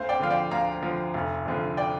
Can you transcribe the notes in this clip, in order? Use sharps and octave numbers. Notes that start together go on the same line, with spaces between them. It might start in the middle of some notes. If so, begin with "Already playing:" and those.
Already playing: D2 C5 F5
D5 G5
D3 F3 F5
D5 G5
D2 F5 A#5
D3 F3
F1
F2 D3 F3
D5 G5